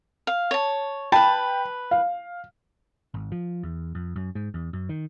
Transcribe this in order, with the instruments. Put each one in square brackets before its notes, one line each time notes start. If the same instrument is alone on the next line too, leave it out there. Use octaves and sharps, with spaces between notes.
[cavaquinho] F5
C#5 A5
[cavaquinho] B4 A5 [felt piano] G5 B5
[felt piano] F5
[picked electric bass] G#1
F3
E2
F2
F#2
G#2
E2
F#2
D#3